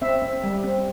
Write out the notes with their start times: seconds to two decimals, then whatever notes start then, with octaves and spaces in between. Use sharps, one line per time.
0.02 C4 E5
0.22 C4
0.44 G3
0.64 C4